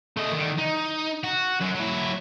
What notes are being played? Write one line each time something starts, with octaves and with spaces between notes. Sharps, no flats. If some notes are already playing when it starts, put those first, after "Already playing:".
A3 D#5
D3 D#3
D#4
F#4
F#2 F#3
F#3 E4